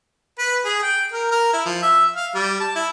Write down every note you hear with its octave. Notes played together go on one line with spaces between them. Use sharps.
B4
G#4
G5
A#4
A#4
E4
F3
E5
F5
G3
A5
E4